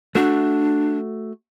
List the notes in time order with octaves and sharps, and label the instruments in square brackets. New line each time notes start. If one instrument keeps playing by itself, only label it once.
[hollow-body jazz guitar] A3 F#4 [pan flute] D4